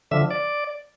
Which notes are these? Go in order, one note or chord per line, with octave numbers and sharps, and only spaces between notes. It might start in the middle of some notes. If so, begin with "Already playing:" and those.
D3 F3 E5
D5